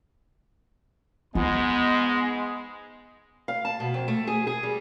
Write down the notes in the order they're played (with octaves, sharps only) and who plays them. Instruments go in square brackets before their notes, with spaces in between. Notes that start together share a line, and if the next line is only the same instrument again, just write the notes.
[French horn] G#2 [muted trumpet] G#3 [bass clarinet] B3 [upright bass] F4
[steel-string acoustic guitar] F5
A5
B2
F2
A3
G#4
G#4
G3